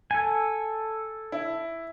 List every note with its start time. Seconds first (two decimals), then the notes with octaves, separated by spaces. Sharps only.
0.11 A4 G#5
1.32 E4